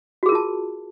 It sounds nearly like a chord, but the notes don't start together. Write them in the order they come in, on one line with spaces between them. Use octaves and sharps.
F#4 G#4 A#4 F4 A5